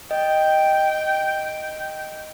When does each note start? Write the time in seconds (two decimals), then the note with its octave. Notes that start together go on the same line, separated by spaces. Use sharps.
0.11 D#5 G5